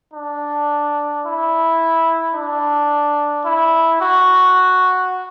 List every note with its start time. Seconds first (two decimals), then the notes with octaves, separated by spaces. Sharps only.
0.14 D4
1.24 E4
2.34 D4
3.43 E4
3.98 F#4